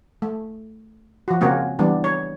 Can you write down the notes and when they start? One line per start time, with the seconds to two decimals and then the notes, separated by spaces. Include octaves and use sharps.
0.22 A3
1.28 F3 F#4
1.41 C#3 A#3 C4 C#4 F#4
1.79 E3 G3 B3 D4
2.04 C#5